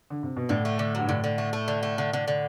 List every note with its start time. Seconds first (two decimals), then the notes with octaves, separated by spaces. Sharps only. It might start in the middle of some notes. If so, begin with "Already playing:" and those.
0.10 D3
0.23 C3
0.37 B2
0.49 A2 D3
0.65 A3
0.79 D3
0.95 G2 F#3
1.09 A2 D3
1.24 D3
1.38 A3
1.53 A3
1.68 D3
1.83 A3
1.98 D3
2.13 D3
2.28 D3